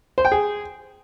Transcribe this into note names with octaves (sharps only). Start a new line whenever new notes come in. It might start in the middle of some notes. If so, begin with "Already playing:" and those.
C5
G5
G#4